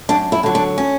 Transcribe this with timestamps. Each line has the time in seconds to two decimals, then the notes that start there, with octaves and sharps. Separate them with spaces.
0.09 F#2 D4
0.32 E4
0.43 D3 F#3
0.55 D4
0.78 C#4